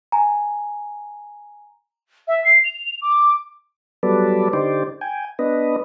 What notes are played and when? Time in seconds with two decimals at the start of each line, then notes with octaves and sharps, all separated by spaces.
0.12 G#5 A#5
2.27 E5
2.44 C7
2.64 F7
3.01 D6
4.03 F#3 G3 B3 A4 B4 D5
4.53 D3 D#4 G4 C5 D5
5.01 G5 G#5
5.39 B3 D4 B4 D#5